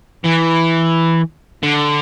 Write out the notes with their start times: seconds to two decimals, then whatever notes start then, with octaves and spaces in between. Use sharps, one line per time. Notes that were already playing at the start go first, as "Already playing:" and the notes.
0.24 E3
1.63 D3